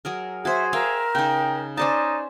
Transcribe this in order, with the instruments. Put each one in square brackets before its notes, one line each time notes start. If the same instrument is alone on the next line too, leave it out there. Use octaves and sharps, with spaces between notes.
[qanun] F#3 G#4 A#4
[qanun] F#4 C5 [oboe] G#4 [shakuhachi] E5
[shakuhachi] A#4 [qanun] E5 F5 G5
[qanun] C#3 D#4 [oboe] G5
[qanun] C#4 C5 A5 [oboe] D#4 [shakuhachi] D5